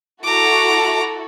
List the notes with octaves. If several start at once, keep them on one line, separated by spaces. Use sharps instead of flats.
E4 F#4 A4 A#5 D6